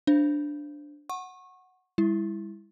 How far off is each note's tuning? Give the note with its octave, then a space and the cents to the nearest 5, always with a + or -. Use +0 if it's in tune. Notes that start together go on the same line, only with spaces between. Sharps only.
D4 +0 C5 +0 F5 -35
F#5 +0 C#6 -25
G3 +40 E4 +0